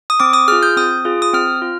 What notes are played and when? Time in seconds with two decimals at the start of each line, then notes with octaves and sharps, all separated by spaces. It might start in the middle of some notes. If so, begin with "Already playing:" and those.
0.10 D#6
0.20 C4 D6
0.33 D#6
0.48 F4 G#4 F6
0.63 G6
0.77 C4 D#6
1.05 F4 G#4
1.22 D#6
1.33 C4 F6
1.62 F4